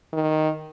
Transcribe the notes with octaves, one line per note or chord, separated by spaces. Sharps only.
D#3